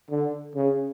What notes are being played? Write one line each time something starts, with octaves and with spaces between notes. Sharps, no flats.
D3
C#3